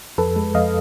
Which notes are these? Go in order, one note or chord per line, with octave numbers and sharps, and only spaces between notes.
F2 A4 B4
G#3
F2 D#5 F5